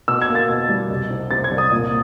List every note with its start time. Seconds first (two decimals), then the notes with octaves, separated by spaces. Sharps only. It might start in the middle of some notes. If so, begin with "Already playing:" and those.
0.08 B2 E6
0.22 G#6
0.28 A#3
0.35 A6
0.49 B2
0.69 G3
0.90 C2
1.10 C3
1.31 C3 A6
1.44 G#6
1.51 C2
1.58 D#6
1.71 A#2